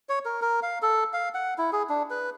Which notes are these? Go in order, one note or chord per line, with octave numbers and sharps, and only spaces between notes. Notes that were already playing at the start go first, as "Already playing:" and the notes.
C#5
A#4
A#4
F5
A4
F5
F#5
E4
G#4
D4
B4